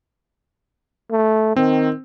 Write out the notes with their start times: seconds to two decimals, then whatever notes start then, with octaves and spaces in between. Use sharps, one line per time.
1.11 A3
1.56 D#3 C4